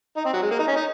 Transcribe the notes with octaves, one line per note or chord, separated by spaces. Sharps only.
D#4
C4
F#3
G#3
A#3
D#4
C#4
D#4